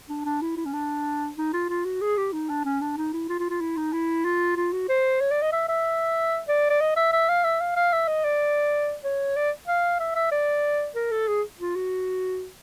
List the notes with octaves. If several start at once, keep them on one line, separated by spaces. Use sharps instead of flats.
D4
D4
E4
E4
C#4
D4
D#4
F4
F4
F#4
G#4
G4
D#4
D4
C#4
D4
D#4
E4
F4
F4
F4
E4
D#4
E4
F4
F4
F#4
C5
C#5
D5
D#5
E5
E5
D5
D5
D#5
E5
E5
F5
E5
F5
F5
E5
D#5
D5
C#5
D5
F5
E5
E5
D5
A#4
A4
G#4
F4
F#4